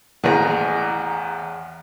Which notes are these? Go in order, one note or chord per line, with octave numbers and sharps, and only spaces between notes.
A1 E2 G#4 A#5